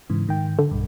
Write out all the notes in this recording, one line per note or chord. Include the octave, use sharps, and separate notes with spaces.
G#2 C#3 E3
G#2 D#3 G5
D3
B1 G2